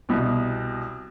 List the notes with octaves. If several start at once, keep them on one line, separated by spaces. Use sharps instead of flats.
C2 B2